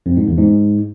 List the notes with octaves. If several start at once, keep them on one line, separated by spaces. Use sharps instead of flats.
F2
G#2
E2
G#2